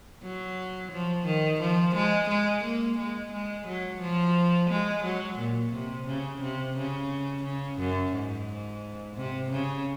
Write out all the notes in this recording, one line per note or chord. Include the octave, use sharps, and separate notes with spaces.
F#3
F3
D#3
F3
G#3
G#3
A#3
G#3
G#3
F#3
F3
G#3
F#3
A#2
C3
C#3
C3
C#3
C#3
F#2
G#2
C3
C#3